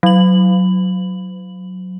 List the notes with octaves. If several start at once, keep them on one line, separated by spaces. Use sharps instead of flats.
F#3 F#7